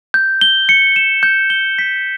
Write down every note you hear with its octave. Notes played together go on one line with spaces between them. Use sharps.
G6
G7
C#7
E7
G6
G7
B6